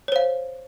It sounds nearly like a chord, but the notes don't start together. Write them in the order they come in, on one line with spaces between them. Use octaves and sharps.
C#5 C5 F5